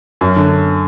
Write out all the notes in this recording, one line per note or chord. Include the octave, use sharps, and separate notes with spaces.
F#2
D3